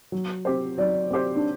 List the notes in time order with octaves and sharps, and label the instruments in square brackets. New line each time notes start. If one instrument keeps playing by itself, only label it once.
[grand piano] F#3
C4 G4 C5
[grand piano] F#3 [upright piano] D5
[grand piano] C4 G4 C5
[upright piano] D4